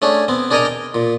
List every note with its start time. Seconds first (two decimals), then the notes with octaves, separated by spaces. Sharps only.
0.02 A3 C#4 D4 G#4
0.28 B3 C4
0.51 D4 G#4 A#4 D5 D#5 A#5
0.65 G5
0.94 A#2